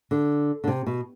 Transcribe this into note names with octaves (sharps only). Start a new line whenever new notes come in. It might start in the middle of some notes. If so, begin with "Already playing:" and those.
D3
D3
C3
B2